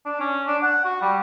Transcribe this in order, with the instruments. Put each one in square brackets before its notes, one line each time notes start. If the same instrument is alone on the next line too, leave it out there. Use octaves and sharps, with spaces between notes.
[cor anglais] D4
C#4
D4
F#5
F#4
G3